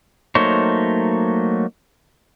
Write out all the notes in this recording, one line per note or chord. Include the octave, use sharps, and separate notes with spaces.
F#3 A3 A#3 D#4 C5 C#5